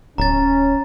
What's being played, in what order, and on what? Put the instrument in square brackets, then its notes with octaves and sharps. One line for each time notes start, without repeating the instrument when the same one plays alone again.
[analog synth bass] D1 [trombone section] C#4 [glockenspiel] A#5 A6